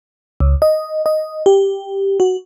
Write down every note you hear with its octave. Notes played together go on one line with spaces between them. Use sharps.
C#2
D#5
D#5
G4
F#4